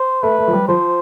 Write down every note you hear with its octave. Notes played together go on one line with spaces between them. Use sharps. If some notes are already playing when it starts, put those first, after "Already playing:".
Already playing: C5
A3 B4
A3
F3
G3
F3 C5